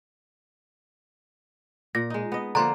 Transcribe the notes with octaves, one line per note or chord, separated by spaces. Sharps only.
A#2 A#6
G#3 D#4
B3 D#5
D3 F3 A#3 A#5 C6